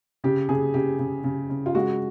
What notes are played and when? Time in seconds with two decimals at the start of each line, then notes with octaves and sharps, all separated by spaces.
0.24 C#3 G4
0.49 C#3 G#4
0.74 C#3 G4
0.99 C#3
1.24 C#3
1.50 C#3
1.66 F4
1.75 G#3 F#4